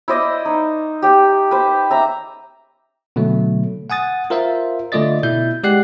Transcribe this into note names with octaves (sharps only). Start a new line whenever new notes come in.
E4 C5 D5 D#5
D#4
G4 G5
B4 C5
E5 A#5
B2 D3 F#3 A3
F#5 G#5 D#6 A6
F4 A#4 C5 E5 F5
D3 A3 F4 D5 D#5 A6
B2 E4 E5 G6
G#3 G4 D5 F#5 F#6 C7